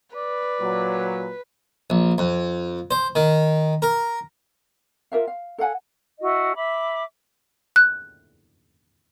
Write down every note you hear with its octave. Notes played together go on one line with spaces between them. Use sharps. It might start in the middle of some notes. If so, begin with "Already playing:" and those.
B4 D5
A#2 F#3
A#1
F2
C5
D#3
A#4
F4 A#4 E5 F5
F5
A4 F5 F#5 G#5
E4 F#4 D#5
E5 B5 D6
F#6